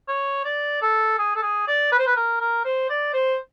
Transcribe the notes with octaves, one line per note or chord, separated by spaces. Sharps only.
C#5
D5
A4
G#4
A4
G#4
D5
B4
C5
B4
A#4
A#4
C5
D5
C5